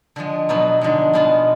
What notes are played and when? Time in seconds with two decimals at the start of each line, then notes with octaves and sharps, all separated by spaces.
0.16 D3 F3 G#3
0.49 B2 F#3 B3 D#4
0.81 D3 F3 G#3
1.13 B2 G#3 B3 F4